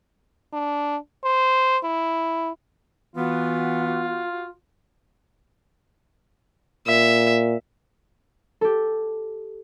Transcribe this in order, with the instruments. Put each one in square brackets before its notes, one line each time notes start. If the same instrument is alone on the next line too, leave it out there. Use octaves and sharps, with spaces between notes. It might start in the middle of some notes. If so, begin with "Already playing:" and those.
[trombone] D4
C5
E4
[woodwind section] E3 B3 [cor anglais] F4 [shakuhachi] F#4
[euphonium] A#2 [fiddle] E5
[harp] G4 A4